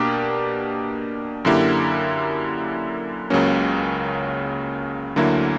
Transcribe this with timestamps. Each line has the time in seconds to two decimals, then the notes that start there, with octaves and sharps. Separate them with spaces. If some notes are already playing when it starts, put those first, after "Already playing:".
Already playing: B2 A#3 D4 G4
1.45 F#2 D3 A#3 E4 G4
3.30 C#2 C#3 F#3 A#3 C#4
5.16 D2 D3 F#3 A#3 E4